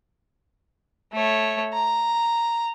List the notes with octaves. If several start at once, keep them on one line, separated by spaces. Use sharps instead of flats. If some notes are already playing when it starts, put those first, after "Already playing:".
A3 C#5
A#5